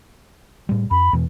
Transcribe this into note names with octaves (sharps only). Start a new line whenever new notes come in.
A2 G3
F2 B5
E2 B2 E3